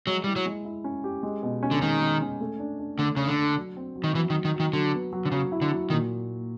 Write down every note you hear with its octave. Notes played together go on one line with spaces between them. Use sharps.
F#3 G#3
G3 E4
F#3
G#3
E4
C#4
G4
G#3
B2
C#4
D3
D#3 G#3
G#3
C#4
A3
D4
D4
D3 A3
C#3 D4
D3
D4
F#3
C4
F#3
D#3
E3 F#3
D#3
F#3
D#3
F#3
D#3
D3 F#3
B3
F#3
D3
C#3 F#3
E4
D3
F#3
A#2 D#3